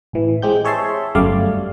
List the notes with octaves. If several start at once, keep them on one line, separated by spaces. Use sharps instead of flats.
A1 E3
G#3 C4 G4 G6
G#4 C#5 E5 A5 C6
G1 F#2 G3 A3 D5 F5